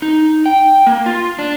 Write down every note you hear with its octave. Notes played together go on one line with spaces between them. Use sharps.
D#4
G5
A#3
F4
D4